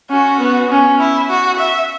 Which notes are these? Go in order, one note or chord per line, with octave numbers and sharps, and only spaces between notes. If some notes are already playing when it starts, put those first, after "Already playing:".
C#4 F#4
B3
C#4
E4
F#4
E5